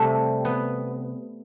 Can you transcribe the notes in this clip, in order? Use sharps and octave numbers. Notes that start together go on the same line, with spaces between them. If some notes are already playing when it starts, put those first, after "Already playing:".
Already playing: C3 G3 A3
B3